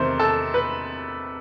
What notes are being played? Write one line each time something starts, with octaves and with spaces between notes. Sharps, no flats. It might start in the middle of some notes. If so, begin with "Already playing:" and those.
Already playing: E2 C3 D#3 A3 C5
A4
B4